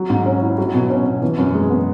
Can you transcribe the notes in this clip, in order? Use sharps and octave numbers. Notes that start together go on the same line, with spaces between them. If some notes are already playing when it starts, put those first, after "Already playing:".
Already playing: F#3
G#2
C#4
E4
F#3
B2
C#4
B2
E3
F#2
G#3
B3